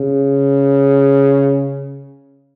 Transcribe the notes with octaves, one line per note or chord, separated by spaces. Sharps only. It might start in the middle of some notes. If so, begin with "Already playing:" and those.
Already playing: C#3